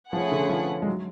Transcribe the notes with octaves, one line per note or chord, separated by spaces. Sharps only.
F3 A3 C#4 G#4 B4 F#5
D3
F3
G#3
F#3